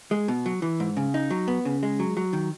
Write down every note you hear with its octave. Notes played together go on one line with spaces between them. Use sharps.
G#3
B2
F#3
E3
G#2
C#3
D#4
F#3
B3
C#3
G#3
F#3
F#3
D#3